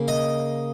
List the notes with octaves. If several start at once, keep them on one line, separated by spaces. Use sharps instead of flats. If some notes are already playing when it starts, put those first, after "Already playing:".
Already playing: C#3 A#3
D#5